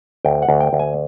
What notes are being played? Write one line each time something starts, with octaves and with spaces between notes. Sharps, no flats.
D2 G5
F#5
D2
G5
D2
G#5